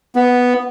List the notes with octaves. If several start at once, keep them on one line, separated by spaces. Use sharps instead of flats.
B3